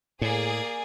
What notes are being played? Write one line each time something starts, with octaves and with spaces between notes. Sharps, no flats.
A2 A#3 G#4 D5